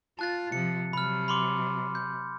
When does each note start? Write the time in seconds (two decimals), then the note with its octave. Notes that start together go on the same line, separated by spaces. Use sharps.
0.19 F4 A5 F#6 A6
0.52 C3 F3 C#7
0.93 C3 F#3 B5 F6
1.28 B5 C6 D6
1.95 G6